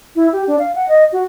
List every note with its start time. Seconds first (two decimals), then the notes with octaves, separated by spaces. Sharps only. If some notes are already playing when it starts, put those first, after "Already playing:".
0.16 E4
0.32 G4
0.47 D4
0.59 F5
0.75 F#5
0.88 D#5
1.12 F#4